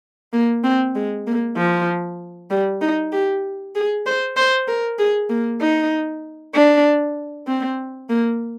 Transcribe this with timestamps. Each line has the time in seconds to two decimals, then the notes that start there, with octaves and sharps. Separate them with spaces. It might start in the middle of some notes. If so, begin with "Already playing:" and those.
0.33 A#3
0.64 C4
0.96 G#3
1.27 A#3
1.57 F3
2.51 G3
2.81 D#4
3.12 G4
3.75 G#4
4.06 C5
4.37 C5
4.68 A#4
4.99 G#4
5.30 A#3
5.61 D#4
6.55 D4
7.47 C4
8.10 A#3